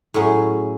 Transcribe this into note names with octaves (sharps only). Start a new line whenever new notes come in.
A2 F#3 C#4 G#4